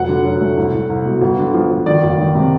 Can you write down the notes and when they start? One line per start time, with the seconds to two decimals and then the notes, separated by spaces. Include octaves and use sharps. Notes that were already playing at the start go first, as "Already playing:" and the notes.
Already playing: F1 F#3 F#5
0.09 D3
0.25 F#2
0.41 A3
0.58 C2
0.74 C2
0.90 C2
1.06 B2
1.21 G1
1.39 D3
1.54 F3
1.71 G1
1.86 D#3 D5
2.03 F#1
2.18 D#3
2.35 C3